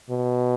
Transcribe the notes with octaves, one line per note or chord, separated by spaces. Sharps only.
B2